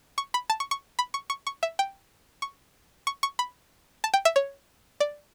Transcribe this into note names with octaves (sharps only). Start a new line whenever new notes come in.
C#6
B5
A5
C#6
C#6
B5
C#6
C#6
C#6
E5
G5
C#6
C#6
C#6
B5
A5
G5
E5
C#5
D5